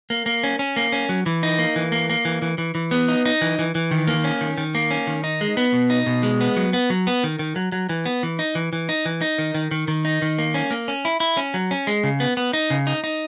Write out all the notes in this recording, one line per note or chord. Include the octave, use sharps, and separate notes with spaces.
A#3
A#3
C#4
C#4
A#3
C#4
F#3
E3
D#4
A#3
E3
A#3
A#3
E3
E3
E3
E3
B3
D#4
D#4
E3
E3
E3
D#3
A#3
C#4
D#3
D#3
A#3
C#4
D#3
D#4
G#3
B3
B2
D#4
B2
G#3
B3
F#3
B3
F#3
B3
D#3
D#3
F#3
F#3
E3
B3
E3
D#4
E3
E3
D#4
E3
D#4
D#3
D#3
D#3
D#3
D#4
D#3
A#3
C#4
A#3
C#4
E4
E4
C#4
F#3
C#4
G#3
C#3
B3
B3
D#4
C#3
D#4
D#4